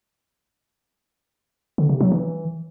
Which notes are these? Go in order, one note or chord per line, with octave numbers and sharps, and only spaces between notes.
D3
C3
F#3
E3